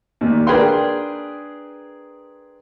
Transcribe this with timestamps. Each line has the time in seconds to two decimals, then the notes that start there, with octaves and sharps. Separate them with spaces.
0.21 D#2 A#2
0.47 D4 G#4 A#4 B4 G5 C6